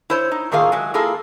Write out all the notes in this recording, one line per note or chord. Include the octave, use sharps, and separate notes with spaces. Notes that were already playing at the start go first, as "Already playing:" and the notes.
E4 C5 C#5
D#4
A2 D#3 A#3 F4 G#4 F5
F#3 G#3
A#3 E4 F4 G#4 A4